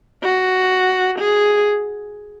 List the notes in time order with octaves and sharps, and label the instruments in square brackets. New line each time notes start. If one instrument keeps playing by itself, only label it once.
[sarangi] F#4
G#4